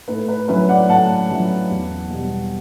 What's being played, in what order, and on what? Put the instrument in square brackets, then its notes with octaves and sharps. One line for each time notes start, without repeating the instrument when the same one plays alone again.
[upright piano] A2 B4
B4
F#3 C#4 E4 B4
D5 F#5
A2 F#5 A5
F#3 C#4 E4
E2
B2 G3